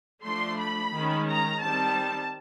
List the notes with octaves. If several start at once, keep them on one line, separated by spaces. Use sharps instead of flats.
F3 A3 D4 C6
B5
D#3 G#3 C#4
A#5
D#3 G3 C4 A5